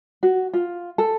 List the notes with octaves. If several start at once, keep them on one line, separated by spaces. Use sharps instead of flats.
F#4
F4
A4